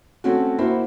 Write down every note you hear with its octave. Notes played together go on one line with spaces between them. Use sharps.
A3 C4 C#4 F#4
A#3 E4 F#4 C5